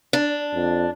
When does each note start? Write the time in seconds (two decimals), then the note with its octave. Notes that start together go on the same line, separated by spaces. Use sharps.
0.13 D4
0.53 F2